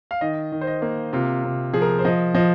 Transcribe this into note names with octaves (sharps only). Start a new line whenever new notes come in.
F5
D#3 D#5
D#3
C5
D#5
A#3
C3 F4
C3
F3 G#4
A#4
C5
F3 D#5
F3 D#5